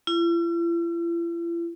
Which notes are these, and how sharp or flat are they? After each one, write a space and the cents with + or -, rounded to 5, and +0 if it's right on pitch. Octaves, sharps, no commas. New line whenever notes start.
E4 +45